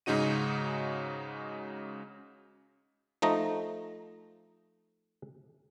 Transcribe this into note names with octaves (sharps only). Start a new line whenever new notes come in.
G#2 C#3 C#4 D#4 F#4 D#7
F3 A3 D#4 A#5